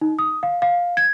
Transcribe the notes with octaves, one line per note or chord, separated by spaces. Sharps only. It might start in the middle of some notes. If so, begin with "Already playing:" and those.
D#4
D#6
F5
F5
G#6